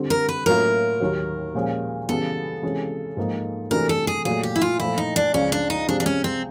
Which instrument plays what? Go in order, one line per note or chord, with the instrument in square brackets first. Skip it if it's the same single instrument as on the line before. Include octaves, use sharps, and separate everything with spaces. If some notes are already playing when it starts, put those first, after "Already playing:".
Already playing: [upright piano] D3 G3 C4
[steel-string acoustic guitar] A#4
B4
[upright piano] A2 F#3 A#3 C#4 F4 [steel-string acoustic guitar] A#4
[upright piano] D#2 D#3 F#3
A#2 F3 G#3 C#4
[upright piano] C#3 E3 G3 B3 [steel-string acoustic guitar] A4
[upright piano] C3 E3 G#3 C#4
G#2 F3 A#3 D#4
[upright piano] C3 E3 A3 D4 F#4 [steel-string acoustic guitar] A#4
[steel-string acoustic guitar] A4
G#4
[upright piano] A#2 F#3 A3 [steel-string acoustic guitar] G#4
[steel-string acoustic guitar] G4
E4
F4
[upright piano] A#2 F3 A3 [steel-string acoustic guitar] E4
[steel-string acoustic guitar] D#4
D4
[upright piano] C#2 C#3 F3 [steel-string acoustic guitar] C#4
[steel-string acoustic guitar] D4
D#4
[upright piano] C3 F3 G#3 [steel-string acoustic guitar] D4
[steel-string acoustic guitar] D4
C#4
C4